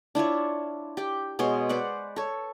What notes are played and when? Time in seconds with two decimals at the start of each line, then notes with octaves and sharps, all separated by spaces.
0.15 D4 E4 F4 C#5
0.97 G4 G5
1.39 B2 G#3 C#5 C6
1.69 B4 C5 D5 F#5
2.16 A4 C#5